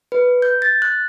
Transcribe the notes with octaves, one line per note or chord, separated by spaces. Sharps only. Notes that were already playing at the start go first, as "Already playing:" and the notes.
B4
G6
A6
F#6